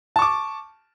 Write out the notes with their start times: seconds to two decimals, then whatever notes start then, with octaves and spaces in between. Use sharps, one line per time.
0.16 A5
0.19 C#6
0.22 D6